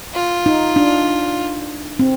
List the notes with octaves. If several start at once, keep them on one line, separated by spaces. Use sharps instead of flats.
F4
D#4
D4
C4